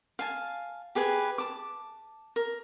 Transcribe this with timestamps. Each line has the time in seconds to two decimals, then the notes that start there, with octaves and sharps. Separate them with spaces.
0.19 F5 G#5 A5
0.95 G4 G#4 B4 G#5
1.38 A5 D6
2.36 A#4